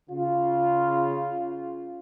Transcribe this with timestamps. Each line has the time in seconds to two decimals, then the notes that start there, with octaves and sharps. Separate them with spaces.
0.10 C#3 F4